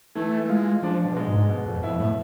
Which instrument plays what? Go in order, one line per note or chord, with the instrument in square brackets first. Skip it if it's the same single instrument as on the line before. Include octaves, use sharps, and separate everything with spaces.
[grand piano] E3 [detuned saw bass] A3
[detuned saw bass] A3
[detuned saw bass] G#3 [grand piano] F4
[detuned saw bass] F3 [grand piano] D4
[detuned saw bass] B2
[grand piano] G#3
[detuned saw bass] G#2
[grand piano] B2
[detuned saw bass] F2
[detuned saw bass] F2 [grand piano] E4
[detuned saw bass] A2